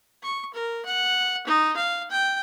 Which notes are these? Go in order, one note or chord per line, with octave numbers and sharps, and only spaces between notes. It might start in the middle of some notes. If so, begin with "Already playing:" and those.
C#6
A#4
F#5
D#4
F5
G5